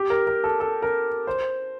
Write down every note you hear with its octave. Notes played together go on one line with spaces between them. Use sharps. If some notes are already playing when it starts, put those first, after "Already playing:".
Already playing: G4
A#4
A#4
A4
A4
A#4
C5